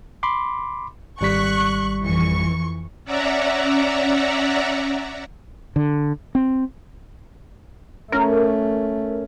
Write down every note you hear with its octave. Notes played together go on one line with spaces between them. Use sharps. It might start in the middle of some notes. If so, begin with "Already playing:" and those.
B5 C6 D6
G#1 G3 C#6 F#6 B6
F2 E3 C#6
C#4 D5 E5 F#5 A#5
D3
C4
A3 C#4 A#4